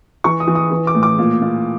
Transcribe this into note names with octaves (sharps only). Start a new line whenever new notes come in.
E3 C#6
D#6
E3
D#6
E3
D6
A2
D6
A#2
A#2